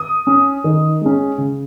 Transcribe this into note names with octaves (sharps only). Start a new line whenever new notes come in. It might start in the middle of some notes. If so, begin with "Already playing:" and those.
Already playing: D#6
C#4
D#3
G#3 C#4
C#3